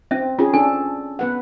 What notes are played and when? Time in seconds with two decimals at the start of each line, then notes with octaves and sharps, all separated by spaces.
0.11 C4 C#4 E5
0.39 C#4 F4 G#4
0.53 D4 A4 G#5
1.19 B3 B4 F#5